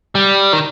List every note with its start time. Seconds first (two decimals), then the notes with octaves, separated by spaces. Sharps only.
0.15 G3
0.53 D#3